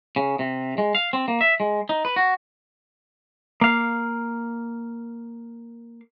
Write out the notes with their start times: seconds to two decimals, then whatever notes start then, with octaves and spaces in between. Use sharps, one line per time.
0.16 C#3
0.39 C3
0.78 G#3
0.95 F5
1.13 C4
1.28 A#3
1.41 E5
1.60 G#3
1.89 D#4
2.05 B4
2.16 F#4
3.61 A#3 F5